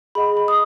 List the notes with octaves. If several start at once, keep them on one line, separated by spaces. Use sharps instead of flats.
G#4 D#5 F#5 B5
B5
D#6